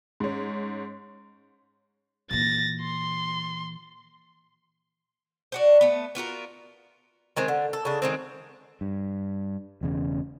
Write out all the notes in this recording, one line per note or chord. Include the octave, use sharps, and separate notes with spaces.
G#2 C#4
A#2 E3 A6 A#6
C6
D4 F#4 C5
A3 B3
B3 F4 F#4 A#4
D#3 G#3 C4
D3
A4
C#3 D4
D#3 G#3 C4
G2
E1 E2 C#3